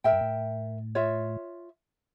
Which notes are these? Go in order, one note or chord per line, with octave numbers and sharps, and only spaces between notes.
A2 A#4 E5 G5
G2
A2
F4 C#5 E5